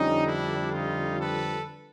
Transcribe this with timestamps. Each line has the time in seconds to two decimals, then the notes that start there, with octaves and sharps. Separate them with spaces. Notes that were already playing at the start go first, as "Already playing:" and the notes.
Already playing: F2 D3 G3 C#4 D#4
0.26 D4 E4
0.73 D#4 F4
1.20 A4 B4